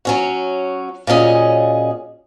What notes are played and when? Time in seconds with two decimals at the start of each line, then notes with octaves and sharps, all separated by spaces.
0.05 F#3 C#4 F#4
1.07 A#2 F#3 C#4 G#4 D#5